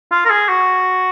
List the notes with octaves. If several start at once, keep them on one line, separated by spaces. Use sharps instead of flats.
F4
A#4
G#4
F#4